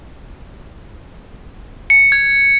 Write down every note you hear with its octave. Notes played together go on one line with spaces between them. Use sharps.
C#7
G#6